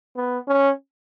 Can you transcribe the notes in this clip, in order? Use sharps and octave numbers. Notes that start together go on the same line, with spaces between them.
B3
C#4